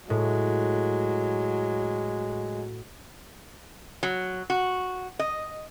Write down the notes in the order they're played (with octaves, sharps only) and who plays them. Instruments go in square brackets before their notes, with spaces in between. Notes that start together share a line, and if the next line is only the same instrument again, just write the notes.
[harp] A2 [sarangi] F#3 [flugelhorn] G#3
[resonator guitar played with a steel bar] F#3
F#4
D#5